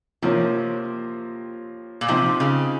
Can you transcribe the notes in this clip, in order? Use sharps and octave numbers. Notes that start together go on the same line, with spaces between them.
C3 F3 A#3 F4 A#4 C#5
A#2
C3 F3 C4 D#4
C#3